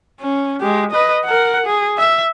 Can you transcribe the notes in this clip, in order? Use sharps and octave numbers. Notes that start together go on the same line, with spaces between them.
C#4
G#3 G4
B4 D#5
A#4 F#5
G#4
E5